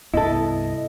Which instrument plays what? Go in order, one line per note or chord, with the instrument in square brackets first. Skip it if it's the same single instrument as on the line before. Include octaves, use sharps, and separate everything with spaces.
[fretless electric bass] C2 G2 B3 [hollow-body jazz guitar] E4 A4 [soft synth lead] D#5